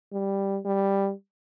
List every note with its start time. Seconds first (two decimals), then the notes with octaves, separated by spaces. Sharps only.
0.12 G3
0.65 G3